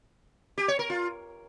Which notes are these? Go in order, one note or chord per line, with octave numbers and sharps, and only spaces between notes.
G4
C#5
A#4
F4